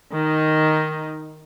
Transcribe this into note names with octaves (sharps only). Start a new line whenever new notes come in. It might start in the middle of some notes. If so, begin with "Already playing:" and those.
D#3 D#4